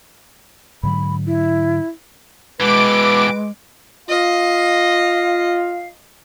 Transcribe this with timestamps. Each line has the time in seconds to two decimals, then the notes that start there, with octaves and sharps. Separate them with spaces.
0.83 G#2 D3 F#3 B5
1.26 E4
2.60 B2 E3 G#3 B4 D6 D7
4.09 F4 D#5 F5